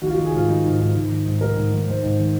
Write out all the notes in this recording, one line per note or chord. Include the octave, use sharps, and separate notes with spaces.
D#3 F#4
F4
F#4
D#3
G#4
G#2 F4
D#3 D#4
G#2
G#2
G#2
D#3
G#2
G#2 A#4
G#2
D#3
D#3 C5
G#2
D#3